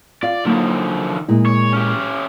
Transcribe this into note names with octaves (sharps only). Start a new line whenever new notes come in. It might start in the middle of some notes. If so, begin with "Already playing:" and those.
F4 D5 F5
D3 D#3 F3 F#3 A#3
A#2 G#3 E4
C#5
C#4 G4